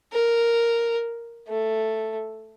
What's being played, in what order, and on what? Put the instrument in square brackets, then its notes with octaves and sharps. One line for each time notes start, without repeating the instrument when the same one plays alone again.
[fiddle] A#4
A3